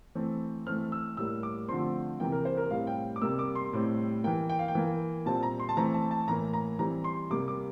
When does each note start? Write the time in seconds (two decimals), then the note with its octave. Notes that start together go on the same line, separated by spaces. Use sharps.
0.15 E3 A3 C4
0.67 E3 A3 C4 F6
0.92 E6
1.17 A2 G3 A#3 E6
1.43 D6
1.69 D3 F3 A3 C4 C6
2.20 C3 E3 A#3 G5
2.32 A#4
2.45 C5
2.57 A#4
2.70 A2 G3 C4 F5
2.87 G5
3.16 D6
3.22 C3 G3 A#3 E6
3.39 D6
3.55 C6
3.73 A2 G3 C4
4.24 E3 A#3 G5
4.50 G5
4.59 F5
4.68 G5
4.75 E3 A#3
5.26 A#2 G3 C4 A5
5.43 A#5
5.59 C6
5.69 A5
5.77 E3 A3 C4 A#5
5.94 A5
6.11 A5
6.28 A2 E3 A#3 A#5
6.53 A#5
6.79 E3 G3 C4 A#5
7.04 C6
7.30 C3 G3 A#3 D6
7.48 D6